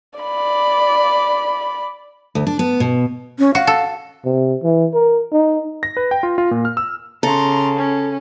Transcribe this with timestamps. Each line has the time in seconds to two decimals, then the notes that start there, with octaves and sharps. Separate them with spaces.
0.19 D5 B5
2.35 D2
2.47 D4
2.59 B3
2.80 B2
3.39 C#4
3.55 F#4 F5
3.67 A4
4.25 C3
4.63 E3
4.94 A#4
5.32 D#4
5.83 A#6
5.97 B4
6.11 G5
6.23 F4
6.38 F4
6.51 A#2
6.65 F6
6.77 E6
7.23 C#3 A4 A#5 C6
7.76 C#4